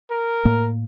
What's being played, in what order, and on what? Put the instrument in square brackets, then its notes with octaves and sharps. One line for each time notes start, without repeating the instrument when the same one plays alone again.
[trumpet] A#4
[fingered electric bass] A2 A#3